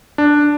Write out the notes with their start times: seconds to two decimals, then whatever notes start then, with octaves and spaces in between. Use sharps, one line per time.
0.18 D4